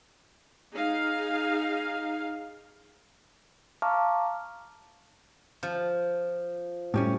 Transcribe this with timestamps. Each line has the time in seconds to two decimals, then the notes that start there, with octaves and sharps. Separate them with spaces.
0.73 D#4 G#4 F5
3.82 F5 A5 A#5 C#6 D6 F6
5.63 F3
6.94 A2 G3 C#4